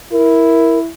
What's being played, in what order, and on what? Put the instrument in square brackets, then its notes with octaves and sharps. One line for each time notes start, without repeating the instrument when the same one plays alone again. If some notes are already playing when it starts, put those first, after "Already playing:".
[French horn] E4 [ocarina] A#4